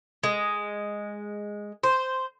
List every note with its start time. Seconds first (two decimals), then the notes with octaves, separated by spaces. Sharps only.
0.23 G#3
1.83 C5